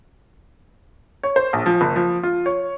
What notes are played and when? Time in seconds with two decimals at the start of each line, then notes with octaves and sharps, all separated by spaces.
1.23 C#5
1.36 C5
1.53 A#1
1.66 F3
1.81 F#1
1.96 F3
2.23 F4
2.46 C#5